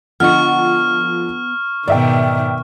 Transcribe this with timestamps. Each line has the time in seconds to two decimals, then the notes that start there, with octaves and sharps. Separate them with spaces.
0.20 D3 F3 B3 D#5 F#5 C#6 F6
1.88 G#2 B2 D#3 D5 E5 G5